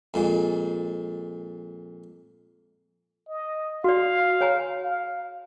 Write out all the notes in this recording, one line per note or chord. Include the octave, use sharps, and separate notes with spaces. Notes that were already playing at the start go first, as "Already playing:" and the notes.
F2 A#2 G#3
D#5
F#4 D5 F5
C#5 G#5 A#5
F5